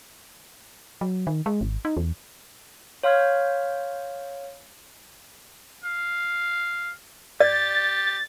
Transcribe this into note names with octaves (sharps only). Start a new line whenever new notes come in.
F#3
D#3
G#3
G#1
D#4
E2
C#5 F5 C6 F6 G6 G#6
F5
G4 D5 A6